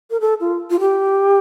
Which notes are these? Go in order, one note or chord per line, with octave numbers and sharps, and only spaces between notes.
A#4
A4
F4
F4
G4